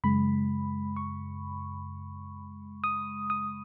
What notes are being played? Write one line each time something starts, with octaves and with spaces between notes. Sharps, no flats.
F#2 C#3 G#3 B5
C#6
D#6
D#6